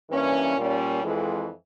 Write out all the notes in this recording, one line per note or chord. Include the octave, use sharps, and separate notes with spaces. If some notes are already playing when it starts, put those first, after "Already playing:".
G2 E3 A#3 C#4
A#2 G3 C#4
F2 E3 G#3